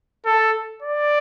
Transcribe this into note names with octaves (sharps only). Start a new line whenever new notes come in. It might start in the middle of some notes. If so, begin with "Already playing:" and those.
A4
D5